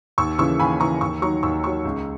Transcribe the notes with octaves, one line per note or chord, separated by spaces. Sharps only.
D#2 C#6 E6
C#3 E3 C#6 E6
D#2 G#5 B5
C#3 E3 A#5 C#6
D#2 C#6 E6
D#3 F#3 A#5 C#6
D#2 C#6 E6
D#3 F#3 C#6 E6
C#2